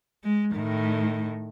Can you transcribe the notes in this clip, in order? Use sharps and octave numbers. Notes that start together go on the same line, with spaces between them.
G#3
A2 D#3